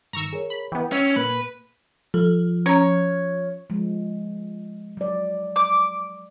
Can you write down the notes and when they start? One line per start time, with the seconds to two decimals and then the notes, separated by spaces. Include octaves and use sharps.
0.13 G2 D#3 A#5 C#6 E6
0.33 G#4 A#4 C#5
0.50 B5
0.72 E3 B3 G5
0.92 C#4 E6 C7 D#7
1.16 A#2 A#3 B4
2.14 F3 A4
2.66 C#4 C#5 A#5
3.70 F3 G#3
4.97 F#3 D5
5.56 D6